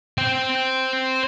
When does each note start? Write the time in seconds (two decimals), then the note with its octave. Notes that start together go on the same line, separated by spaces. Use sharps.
0.18 C5 G5